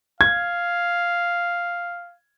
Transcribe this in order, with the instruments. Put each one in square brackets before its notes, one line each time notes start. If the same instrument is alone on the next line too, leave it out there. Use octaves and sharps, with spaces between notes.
[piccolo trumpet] F5 [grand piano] G#6